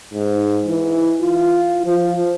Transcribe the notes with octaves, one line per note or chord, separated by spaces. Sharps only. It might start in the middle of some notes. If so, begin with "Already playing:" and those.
G#2
E3
F4
F3